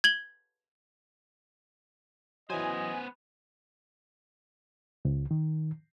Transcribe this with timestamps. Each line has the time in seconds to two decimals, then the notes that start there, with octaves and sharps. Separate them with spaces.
0.04 G#6 F#7 G7
2.50 E3 F#3 B3 C5 D#5 G#5
5.05 C#2
5.31 D#3